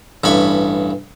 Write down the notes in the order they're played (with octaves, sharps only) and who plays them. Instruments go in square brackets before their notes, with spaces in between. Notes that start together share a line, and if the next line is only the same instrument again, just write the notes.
[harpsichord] A1 G2 B5 C#6